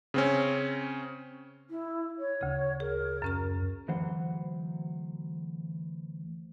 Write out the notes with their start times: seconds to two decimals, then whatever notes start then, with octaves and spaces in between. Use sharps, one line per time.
0.14 C#3 C4 C#4
1.70 E4
2.18 C#5
2.41 D2 C#3
2.80 G#4 A#4
3.22 F#2 C#4 A#5
3.88 D2 E3 F#3 C5 F#5